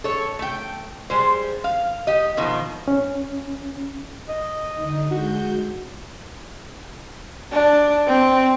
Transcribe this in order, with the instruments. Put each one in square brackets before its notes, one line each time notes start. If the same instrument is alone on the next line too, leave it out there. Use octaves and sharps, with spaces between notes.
[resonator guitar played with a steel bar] A4 C#5
A3 G5
G3 G#3 C5
F5
G4 D#5
B2 D#3 F3
[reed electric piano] C#4
[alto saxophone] D#5
[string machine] D3 D#4
[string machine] G#3 G6 [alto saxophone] F#4
[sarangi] D4
C4